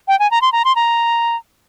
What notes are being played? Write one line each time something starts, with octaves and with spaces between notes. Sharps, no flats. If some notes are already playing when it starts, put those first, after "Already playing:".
G5
G#5
A#5
C6
A#5
C6
A#5